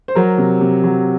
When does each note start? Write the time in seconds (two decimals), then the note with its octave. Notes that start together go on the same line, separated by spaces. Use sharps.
0.08 C5
0.15 F#3 A#4
0.38 C3
0.61 C3
0.84 F#3